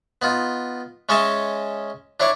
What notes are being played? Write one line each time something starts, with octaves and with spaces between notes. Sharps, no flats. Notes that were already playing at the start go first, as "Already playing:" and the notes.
B3 D#4 F4
G#3 C#4 C#5 D#5 E5 A5
D4 E4 C#5 D5